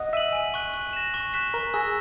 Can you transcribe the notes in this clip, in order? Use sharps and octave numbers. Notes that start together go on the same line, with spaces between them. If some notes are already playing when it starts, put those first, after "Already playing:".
Already playing: D#5 F#5
E5 B6 D#7 F#7
G#5
C#6 F#6
F#6
A#6 E7
C#6
F#6 B6 E7
A#4 C#6
G#4 E6 A#6